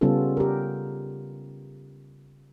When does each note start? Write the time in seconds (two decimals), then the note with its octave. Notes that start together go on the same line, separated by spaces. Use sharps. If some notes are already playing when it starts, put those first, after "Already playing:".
0.01 C#3 G3 B3 C#4 F4 A4
0.37 G4 A#4